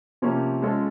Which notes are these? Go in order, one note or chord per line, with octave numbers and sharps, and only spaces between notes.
C3 F3 A#3 C#4
G#3 C#4 F4 A4